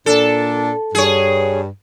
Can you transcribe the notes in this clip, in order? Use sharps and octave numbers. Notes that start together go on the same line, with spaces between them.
A#2 D4 A4
G2 G#4 C#5